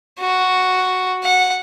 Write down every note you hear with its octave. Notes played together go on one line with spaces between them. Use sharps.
F#4
F#5